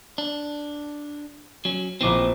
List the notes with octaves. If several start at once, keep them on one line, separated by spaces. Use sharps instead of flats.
D4
F#3 C#4
A#1 B2 E3 C4 D6 C7